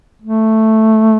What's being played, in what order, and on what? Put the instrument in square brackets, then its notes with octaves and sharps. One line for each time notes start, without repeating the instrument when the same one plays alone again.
[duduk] A3